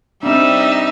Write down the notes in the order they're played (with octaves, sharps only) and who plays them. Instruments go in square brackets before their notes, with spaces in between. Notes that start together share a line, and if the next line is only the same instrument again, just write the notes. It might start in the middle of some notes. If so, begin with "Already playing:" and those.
[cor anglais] G3 [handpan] C4 D4 [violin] D#4 [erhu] E5